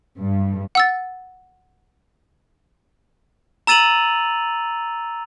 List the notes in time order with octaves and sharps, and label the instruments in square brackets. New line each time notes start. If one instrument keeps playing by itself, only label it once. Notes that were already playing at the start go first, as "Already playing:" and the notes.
[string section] G2
[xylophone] F#5 E6 A6
[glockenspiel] A#5 E6 A6 D#7 F7 F#7